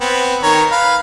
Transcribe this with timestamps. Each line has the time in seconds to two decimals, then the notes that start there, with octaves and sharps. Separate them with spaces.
0.01 B3 C4
0.43 D#3 A#4 C#5
0.71 B4 F5